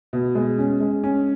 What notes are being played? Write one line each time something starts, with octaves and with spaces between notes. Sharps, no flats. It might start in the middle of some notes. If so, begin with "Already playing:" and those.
B2
G#3
C#4
G#3
C#4